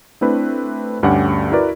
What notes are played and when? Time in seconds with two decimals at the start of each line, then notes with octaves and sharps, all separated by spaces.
0.21 A3 C4 D4 E4 B4
1.03 D2 G2 C#4 G4 F#5
1.52 E4 F#4 A#4 B4 D5